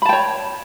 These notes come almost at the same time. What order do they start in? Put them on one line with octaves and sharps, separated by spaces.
B5 A5 G5 C#5